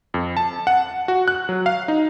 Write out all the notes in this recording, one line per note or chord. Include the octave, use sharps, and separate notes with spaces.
F2
A5
F#5
F#4
F#6
F#3
F5
D#4